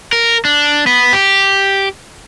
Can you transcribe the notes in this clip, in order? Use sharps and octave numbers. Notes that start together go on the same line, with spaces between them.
A#4
D4
B3
G4